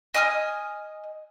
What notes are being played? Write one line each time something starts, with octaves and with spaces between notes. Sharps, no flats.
D#5 G#5 D#6 F6